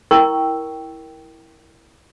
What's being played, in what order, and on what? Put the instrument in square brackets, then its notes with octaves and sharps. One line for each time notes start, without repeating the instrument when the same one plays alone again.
[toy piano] E4 A#4 G5 C#6 E6